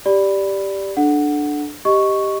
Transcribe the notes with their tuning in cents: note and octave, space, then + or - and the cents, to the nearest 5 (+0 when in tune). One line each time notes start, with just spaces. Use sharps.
G4 +0 D5 -5 B5 +0
D4 +10 A4 -15 F#5 +0
G4 +0 D#5 +0 C#6 +0